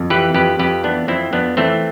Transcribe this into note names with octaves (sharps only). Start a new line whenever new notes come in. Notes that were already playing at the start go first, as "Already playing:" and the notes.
Already playing: F2
E3 G4 B4
F2 G4 B4
F2 G4 B4
E3 B3 D4
F2 C4 E4
F2 B3 D4
E3 A3 C4